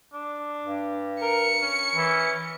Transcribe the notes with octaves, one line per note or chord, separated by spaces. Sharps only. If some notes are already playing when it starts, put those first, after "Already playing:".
D4
G2
A#4 C#7
C#4
E3